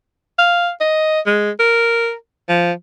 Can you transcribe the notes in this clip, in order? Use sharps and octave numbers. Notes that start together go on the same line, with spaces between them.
F5
D#5
G#3
A#4
F3